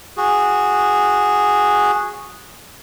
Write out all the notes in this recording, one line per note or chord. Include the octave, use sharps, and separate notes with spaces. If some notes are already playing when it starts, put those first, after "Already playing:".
F#4 G#4